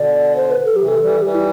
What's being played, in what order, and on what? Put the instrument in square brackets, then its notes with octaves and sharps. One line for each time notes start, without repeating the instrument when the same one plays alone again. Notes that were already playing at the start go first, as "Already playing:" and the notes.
Already playing: [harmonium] B2 D3 [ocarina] D5
[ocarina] C5
B4
A4
[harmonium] F#3
[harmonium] C3 E3 [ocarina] G4
[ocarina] A4
[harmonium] E3 G3
[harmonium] E3 G3 [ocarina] G4
[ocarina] E4